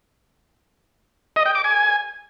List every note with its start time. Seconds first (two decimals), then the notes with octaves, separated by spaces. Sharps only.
1.36 D#5
1.46 G5
1.55 D6
1.64 G#5